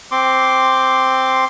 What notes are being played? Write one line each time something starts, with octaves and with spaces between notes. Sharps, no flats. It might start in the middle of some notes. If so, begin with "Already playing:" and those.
C4 C6 D6